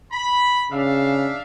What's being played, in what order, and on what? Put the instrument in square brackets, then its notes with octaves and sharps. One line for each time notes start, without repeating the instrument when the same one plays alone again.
[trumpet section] B5
[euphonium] C#3 [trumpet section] D4 E5 F5